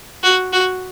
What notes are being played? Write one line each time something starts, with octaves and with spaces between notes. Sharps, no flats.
F#4
F#4